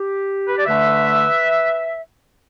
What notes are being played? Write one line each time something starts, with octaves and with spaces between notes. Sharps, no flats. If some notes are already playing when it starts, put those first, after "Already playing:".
Already playing: G4
B4
D5
D3 A3 D4 B4 E5